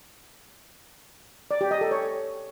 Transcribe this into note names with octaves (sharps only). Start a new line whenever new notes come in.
D5
G4
D#5
A4
C#5